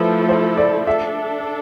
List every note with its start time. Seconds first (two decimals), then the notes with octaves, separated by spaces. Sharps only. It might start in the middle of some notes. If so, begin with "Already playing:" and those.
Already playing: F3 A3 E4 A4 B4
0.29 C5
0.57 D5
0.86 D4 A4 E5